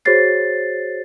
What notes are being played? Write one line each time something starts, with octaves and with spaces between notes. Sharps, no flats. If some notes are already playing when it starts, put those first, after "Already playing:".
F#4 G#4 C5 C#5 A6 C7